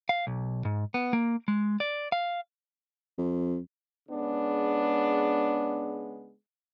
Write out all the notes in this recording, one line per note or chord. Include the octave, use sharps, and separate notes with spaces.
F5
B1
G#2
B3
A#3
G#3
D5
F5
F2
C#3 G#3 B3 D4